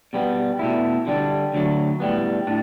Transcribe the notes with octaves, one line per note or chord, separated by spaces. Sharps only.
B2 G3 B3
B2 A3 E4
D3 G3 D4
D2 D3 F#3 A3
A2 G3 B3
A2 D4